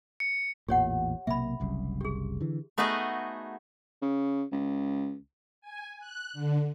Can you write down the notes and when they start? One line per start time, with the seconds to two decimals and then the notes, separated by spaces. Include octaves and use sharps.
0.20 C#7
0.69 A1 E2 A#2 G4 C#5 F#5
1.27 B1 C3 A#3 E5 B5
1.60 F#1 C2 F#2
2.01 G4 G#4
2.41 D3 E3
2.78 A3 B3 D#4 F#4 G#4 D#5
4.02 C#3
4.52 C#2
5.61 G#5
5.99 F#6
6.33 D3